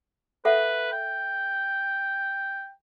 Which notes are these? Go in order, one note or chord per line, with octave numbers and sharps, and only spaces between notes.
A4 B4 E5 F#5
G5